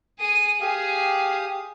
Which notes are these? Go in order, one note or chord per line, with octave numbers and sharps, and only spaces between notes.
G#4 D#6
G4 G#4 F5 D#6